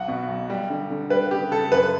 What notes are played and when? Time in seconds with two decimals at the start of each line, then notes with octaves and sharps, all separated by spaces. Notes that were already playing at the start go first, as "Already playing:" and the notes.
Already playing: B1 F#5
0.08 B2
0.28 B1
0.50 G3
0.70 D3
0.90 D3
1.10 G3 B4
1.31 C#3 G4
1.52 C#3 A4
1.72 F#2 B4